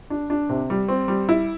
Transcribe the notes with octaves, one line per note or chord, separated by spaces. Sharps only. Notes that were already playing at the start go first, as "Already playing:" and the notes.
D4
D4
C3
G3
C4
G3
E4